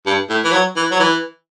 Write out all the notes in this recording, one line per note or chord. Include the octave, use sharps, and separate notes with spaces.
G2
A2
E3
F#3
E3
F#3
E3